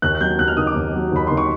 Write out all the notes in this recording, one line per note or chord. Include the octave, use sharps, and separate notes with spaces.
D#2 F#6
F#6
F#3 G6
D#2 F#6
F6
D#3 D#6
D6
D#2
F#3
D#2 B5
D#3 C6
C#6